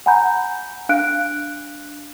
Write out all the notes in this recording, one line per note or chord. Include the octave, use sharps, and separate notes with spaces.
F#5 G#5 A#5 B5 G6
D4 F5 F#6 D7